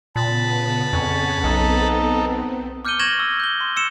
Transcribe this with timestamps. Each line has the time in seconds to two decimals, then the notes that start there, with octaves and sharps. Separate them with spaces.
0.16 A#2 C#3 B3 A5 B5
0.93 F2 C#4 G#4 F#5 G#6
1.44 B1 B3 C4 D#4 A4
2.85 D6 F6 G6 C#7 D#7 G7
2.99 C#6 G#6 A#6 E7 F#7
3.20 E6
3.40 G6 G7
3.60 C6
3.76 E6 C#7 E7